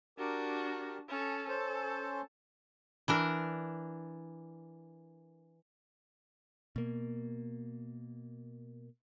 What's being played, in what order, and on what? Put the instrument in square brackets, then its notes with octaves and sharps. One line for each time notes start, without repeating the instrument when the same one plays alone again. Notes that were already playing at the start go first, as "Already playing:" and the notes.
[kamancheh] D4 F#4 [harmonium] G4 A#4
[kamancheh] C#4 A4
[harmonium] C#4 C5 [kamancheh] A4
[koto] E3 D4 A#4
[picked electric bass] B2 A#3